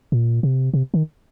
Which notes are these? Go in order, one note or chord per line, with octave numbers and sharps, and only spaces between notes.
A#2
C3
C3
D#3